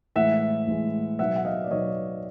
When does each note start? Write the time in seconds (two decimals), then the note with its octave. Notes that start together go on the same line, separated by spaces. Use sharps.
0.16 A2 E3 G#3 E5 F#5
0.67 A2 E3 G#3
1.19 B2 F#3 B3 D#4 E5 F#5
1.36 F#5
1.45 D#5 F5
1.64 D5
1.71 B2 F#3 B3 D#4 C#5 D#5